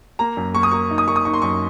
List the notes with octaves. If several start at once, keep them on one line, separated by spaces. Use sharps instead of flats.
A#3 A#5
F#2
A#3 C#6
D#6
A#3 C#6
D#4
D#6
A#3 C#6
D#6
D#4 C#6
C6
F#2 C#6